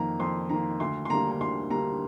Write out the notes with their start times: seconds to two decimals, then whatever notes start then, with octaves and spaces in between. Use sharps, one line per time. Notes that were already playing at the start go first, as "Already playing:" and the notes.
Already playing: F2 D#3 A#3 A#5
0.20 F2 C6
0.49 D#3 A#3 A#5
0.80 D2 C6
1.05 C6
1.10 D3 G3 A#3 A#5
1.31 A#5
1.40 D2 C6
1.70 D3 G3 A#3 A#5